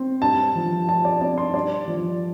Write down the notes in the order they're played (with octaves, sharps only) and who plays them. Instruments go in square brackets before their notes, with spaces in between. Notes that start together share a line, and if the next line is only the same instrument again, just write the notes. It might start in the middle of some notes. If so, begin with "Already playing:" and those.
Already playing: [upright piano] C4
G2 A5
F3
F4 A5
D5
C4 D5
C6
G2 D5
F3